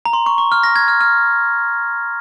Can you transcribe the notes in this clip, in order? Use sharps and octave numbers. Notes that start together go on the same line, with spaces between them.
A#5
C6
C#6
C#6
F6
A#6
G#6
F6
F6